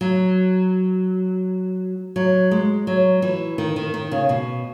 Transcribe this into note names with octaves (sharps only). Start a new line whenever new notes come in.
F#3
F#3
G#3
F#3
E3
D#3
D#3
D#3
C#3
B2